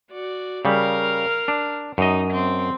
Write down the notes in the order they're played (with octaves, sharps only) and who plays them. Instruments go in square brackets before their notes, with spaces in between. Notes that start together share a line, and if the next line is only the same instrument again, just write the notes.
[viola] F#4 D5
[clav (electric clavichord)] C#3 G3 [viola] A#4 F5
[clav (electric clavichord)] D4
[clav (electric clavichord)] F#2 D#5 [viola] D#4
[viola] C4